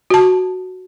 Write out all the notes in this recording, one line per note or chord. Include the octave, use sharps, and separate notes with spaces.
F#4 A5